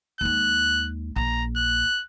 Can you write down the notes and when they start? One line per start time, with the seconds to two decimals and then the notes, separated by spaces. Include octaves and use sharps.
0.21 D#2 G#3 F#6
1.16 A#1 A#5
1.56 F#6